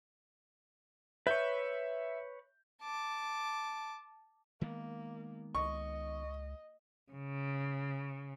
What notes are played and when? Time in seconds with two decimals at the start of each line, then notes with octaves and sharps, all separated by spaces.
1.27 B4 C#5 E5 G6
2.82 A5 D6
4.61 D#3 G#3 A#3 B3
5.55 C#2 D#5 C#6
7.10 C#3